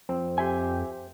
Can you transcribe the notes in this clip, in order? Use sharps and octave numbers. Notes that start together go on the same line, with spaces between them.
F2 C4
G4 C5 E5 G#5